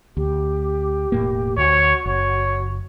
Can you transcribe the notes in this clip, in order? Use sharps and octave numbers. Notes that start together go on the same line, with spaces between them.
D2 G4
E1 A2 A#3
D2 F#4 C#5
F#1 C#5